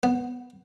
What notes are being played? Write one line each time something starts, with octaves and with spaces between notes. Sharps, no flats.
B3